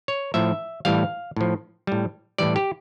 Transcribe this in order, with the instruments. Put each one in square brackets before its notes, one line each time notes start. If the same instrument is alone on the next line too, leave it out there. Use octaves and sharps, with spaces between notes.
[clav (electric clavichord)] C#5
A2 F3 E5
A2 E3 G3 F5
A2 F3
A2 G3
A2 E3 G3 D5
G4